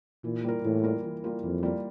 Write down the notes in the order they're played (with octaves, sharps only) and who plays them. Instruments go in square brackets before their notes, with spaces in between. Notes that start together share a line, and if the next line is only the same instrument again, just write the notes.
[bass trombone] A#2 [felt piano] E3
[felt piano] G3 A#3 F4 A#4
[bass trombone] A2 [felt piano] E3
[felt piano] G3 A#3 F4 A#4
E3
G3 A#3 F4 A#4
[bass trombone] F2 [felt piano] E3
[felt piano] G3 A#3 F4 A#4